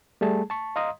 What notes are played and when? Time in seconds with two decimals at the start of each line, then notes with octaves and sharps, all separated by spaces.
0.21 G3 A3 G#4 A5
0.50 A5 C#6
0.76 D#5 F5 A#5 C6 D#6